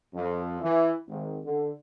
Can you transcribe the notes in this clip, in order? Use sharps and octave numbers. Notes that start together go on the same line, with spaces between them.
F2
E3
G#1
D3